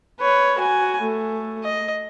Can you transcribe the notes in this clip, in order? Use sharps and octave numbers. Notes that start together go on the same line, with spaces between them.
B4 C#5
F#4 G#5
A3
D#5